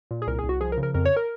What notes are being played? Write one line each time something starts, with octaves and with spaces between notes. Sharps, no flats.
A#2
G#4
C2 A#4
G#4
C2
F#4
F3 G#4
A#4
C#3
A#4
F2 A#4
C#5
A#4